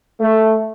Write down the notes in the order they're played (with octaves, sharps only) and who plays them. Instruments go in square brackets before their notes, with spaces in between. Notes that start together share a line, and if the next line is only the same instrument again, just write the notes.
[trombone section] A3